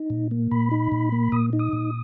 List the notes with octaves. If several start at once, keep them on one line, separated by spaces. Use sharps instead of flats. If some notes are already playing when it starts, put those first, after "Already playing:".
Already playing: D#4
A#2
A#3
A#2 B5
D#4
A#2
A#3
A#2 D#6
D#4
D#6
A#2